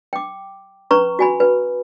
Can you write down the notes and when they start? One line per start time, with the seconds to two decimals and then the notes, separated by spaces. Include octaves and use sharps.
0.13 G5 D6
0.91 C#4 B4 A#5 C#6
1.19 F#4 G#5 B5
1.40 B4